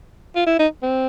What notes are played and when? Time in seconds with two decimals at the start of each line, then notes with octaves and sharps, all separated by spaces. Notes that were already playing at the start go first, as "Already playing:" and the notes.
0.35 F4
0.47 E4
0.59 D#4
0.83 C4